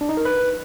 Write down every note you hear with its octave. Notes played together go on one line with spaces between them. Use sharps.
D4
D#4
A#4
B4